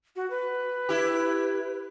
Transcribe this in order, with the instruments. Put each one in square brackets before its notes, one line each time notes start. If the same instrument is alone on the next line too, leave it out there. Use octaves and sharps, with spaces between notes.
[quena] F#4
B4
[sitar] E4 G4